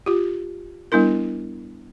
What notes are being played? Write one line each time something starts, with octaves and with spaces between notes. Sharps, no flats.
F4 G4
G3 B3 D4 E4 A#4